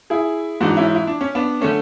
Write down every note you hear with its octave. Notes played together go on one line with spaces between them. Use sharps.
E4 G#4
G#2 E3 D4 F#4
C#4 E4
E4
D4
C#4
B3 D4
D3 A3 C#4